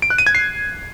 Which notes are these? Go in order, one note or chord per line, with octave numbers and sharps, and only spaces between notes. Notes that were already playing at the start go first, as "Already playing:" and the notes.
D7
F#6
D#7
G#6
C7